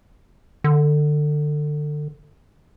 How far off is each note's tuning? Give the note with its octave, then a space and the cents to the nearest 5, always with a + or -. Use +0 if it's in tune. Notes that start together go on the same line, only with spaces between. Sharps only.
D3 +25